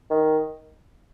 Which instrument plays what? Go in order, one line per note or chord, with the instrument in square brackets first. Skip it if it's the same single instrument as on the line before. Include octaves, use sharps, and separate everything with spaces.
[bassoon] D#3